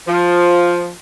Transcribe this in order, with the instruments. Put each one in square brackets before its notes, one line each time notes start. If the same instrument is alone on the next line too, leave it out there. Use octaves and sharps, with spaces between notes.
[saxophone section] F3